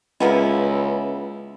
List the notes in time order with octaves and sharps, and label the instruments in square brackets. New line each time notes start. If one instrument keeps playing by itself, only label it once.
[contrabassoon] C#2 [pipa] A#3 B3 E4